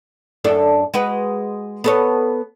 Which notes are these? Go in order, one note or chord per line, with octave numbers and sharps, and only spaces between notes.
F#2 D4 A4
G#3 F#4 B4
B3 A4 C#5